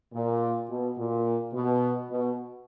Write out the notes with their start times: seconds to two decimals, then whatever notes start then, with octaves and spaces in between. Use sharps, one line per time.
0.13 A#2
0.69 B2
0.97 A#2
1.53 B2
2.09 B2